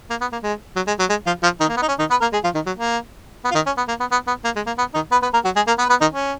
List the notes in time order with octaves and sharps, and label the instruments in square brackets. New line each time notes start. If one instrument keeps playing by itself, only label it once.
[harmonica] A#3
B3
A#3
G#3
F#3
G#3
F#3
G#3
F3 F4
F3 F4
D#3 D#4
A#3
B3
D#4
C#4
D#3 D#4
B3 B4
A#3 A#4
G#3 G#4
F3 F4
D#3 D#4
F#3
A#3
B3
F4
D#3 D#4
C#4
B3
A#3
B3
B3
B3
A#3
G#3
A#3
B3
D#3 D#4
B3 B4
B3 B4
A#3 A#4
F#3 F#4
G#3 G#4
A#3 A#4
B3 B4
B3 B4
D#3 D#4
C#4